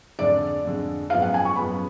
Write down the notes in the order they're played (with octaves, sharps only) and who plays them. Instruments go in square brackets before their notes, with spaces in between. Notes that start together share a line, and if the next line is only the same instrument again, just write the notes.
[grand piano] F2 D3 G#3 [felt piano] D5
[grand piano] F2 D3 G#3
[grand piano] F#2 F3 G#3 B3 [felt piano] F5
[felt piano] F#5
G#5
C#6
[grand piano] F#2 F3 G#3 B3 [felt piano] B5